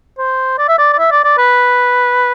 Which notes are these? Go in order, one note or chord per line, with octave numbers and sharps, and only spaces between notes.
C5
D5
E5
D5
D5
E5
D5
D5
B4